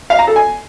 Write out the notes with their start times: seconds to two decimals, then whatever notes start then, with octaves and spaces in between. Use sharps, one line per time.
0.10 F5
0.19 A#5
0.27 A4
0.36 G#5